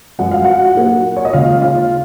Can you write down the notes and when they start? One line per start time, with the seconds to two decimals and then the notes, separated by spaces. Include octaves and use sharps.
0.19 F#2 F3 G#3 F#5
0.31 F5
0.44 F#4 F#5
0.76 A#2 F#3 A#3
1.17 C#5
1.25 D#5
1.33 D#2 C#3 G#3 F4 F5
1.62 F4 F5